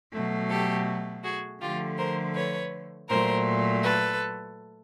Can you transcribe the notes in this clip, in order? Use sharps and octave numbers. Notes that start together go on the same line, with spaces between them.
B2 F#3 A3
G4 A4
F#4 G#4
D3 F3 A3 F4 G4
A#4 C5
B4 C#5
A#2 F#3 A3 A#4 C5
A4 B4